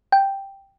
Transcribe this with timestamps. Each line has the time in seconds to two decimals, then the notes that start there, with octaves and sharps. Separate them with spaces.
0.12 G5